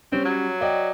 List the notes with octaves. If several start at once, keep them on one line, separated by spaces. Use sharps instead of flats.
G3 C4 C#4
F#3
D5 D#5 G5